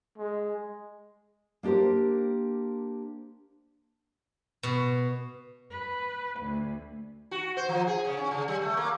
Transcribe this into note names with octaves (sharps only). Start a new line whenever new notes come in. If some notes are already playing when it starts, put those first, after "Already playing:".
G#3
A#3 D4 G4 A#4 C5
B2
B4
D2
F#4
C5
F3
G#4
C#3
C#4
C#3
G3
A3
A#3